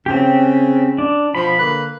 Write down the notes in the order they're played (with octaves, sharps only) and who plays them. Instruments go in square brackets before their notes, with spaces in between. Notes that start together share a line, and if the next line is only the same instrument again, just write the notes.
[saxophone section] C#3 [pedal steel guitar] C4 G4
[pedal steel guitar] D4
[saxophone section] B2 F3 [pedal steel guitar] B5
[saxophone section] D3 A#3 B4